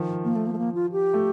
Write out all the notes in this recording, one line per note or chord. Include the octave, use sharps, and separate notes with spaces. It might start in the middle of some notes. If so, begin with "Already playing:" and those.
Already playing: D#3 F3
A#3
A3
A#3
A3
A#3
F4
G4
A3